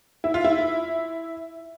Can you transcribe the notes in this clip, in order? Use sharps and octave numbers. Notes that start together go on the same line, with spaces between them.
E4
F4
E4